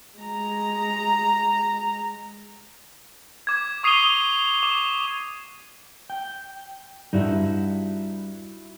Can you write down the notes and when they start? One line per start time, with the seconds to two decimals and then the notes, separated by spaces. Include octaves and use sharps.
0.19 G#3 A#5
3.47 D6 G#6
3.83 C#6 D#6 C7 D#7 F7 G7
4.63 D6
6.10 G5
7.13 G2 D#4 E4 F#4